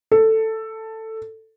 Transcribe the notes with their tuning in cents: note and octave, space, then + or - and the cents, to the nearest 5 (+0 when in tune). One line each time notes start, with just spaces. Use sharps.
A4 +10